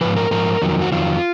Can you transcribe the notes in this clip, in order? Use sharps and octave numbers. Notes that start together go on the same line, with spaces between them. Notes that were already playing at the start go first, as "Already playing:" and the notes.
G#2 F3 B4
A#4
G#2 F3 A#4
F2 D#3 F#3
F#4
F2 D#3 F#3 F4